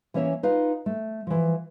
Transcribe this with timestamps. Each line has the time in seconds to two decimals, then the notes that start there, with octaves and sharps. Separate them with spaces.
0.14 E3 A#3 C#4 C#5 E5
0.43 D#4 F4 B4 F5
0.86 A3
1.27 E3 F3